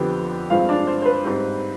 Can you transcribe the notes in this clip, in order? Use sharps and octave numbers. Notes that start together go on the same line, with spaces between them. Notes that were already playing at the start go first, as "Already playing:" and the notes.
Already playing: F2 D3 F3 B3 G4 G5
G2 F3 G#3 C4 F4 F5
D4 D5
C5
C5
B4
G#2 G3 C4